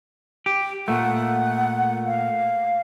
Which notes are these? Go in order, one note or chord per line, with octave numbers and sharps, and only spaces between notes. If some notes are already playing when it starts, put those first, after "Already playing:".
G4
A#2 A3 F#5
F5